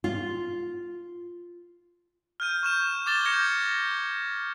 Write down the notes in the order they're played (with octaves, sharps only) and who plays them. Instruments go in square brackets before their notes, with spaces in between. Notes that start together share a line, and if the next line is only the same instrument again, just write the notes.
[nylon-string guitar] F4
[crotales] F6 G6 D#7
C#6 G6 E7
D6 G#6 A6 E7 G7
D6 G6 G#6 A#6 C#7